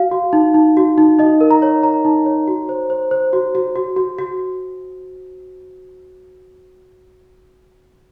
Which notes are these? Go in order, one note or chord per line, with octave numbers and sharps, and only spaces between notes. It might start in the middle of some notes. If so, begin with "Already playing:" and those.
Already playing: F#4 F5
F#4
D#4
D#4
F#4
D#4
D#4 D#5
A#4
A#5
C#5
C#5 A#5
D#4
C#5
F#4
C5
C5
C5
F#4
F#4
F#4
F#4
F#4